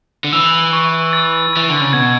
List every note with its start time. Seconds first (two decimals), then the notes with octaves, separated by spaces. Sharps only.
0.24 D3
0.33 E3 E6
0.73 C#6
1.13 A6
1.53 E3 A6
1.70 D3
1.81 C#3
1.93 B2 G#6